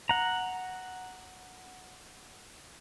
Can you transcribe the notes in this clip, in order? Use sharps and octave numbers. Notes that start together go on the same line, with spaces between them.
F#5 A#5